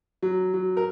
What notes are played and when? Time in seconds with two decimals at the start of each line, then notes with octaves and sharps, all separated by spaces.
0.22 F#3
0.54 F#3
0.77 A#4